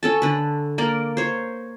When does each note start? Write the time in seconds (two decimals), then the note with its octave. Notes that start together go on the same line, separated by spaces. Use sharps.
0.03 C#4 A4 A5
0.22 D3 B4
0.78 A#3 A#4 D5
1.17 C5 C#5